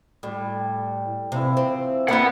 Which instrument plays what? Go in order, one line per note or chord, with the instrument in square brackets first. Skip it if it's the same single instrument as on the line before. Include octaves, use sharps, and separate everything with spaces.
[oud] A2 [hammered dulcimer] G3
[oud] C3 [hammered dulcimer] E3 F3 E4
[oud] C4
[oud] A#3 C4 [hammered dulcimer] D4 E4 G5 [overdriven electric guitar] F#5 B5